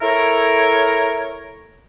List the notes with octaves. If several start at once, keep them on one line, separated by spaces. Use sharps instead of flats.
E4 A4 A#4 C#5